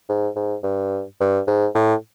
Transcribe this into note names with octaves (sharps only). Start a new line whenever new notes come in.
G#2
G#2
G2
G2
G#2
A2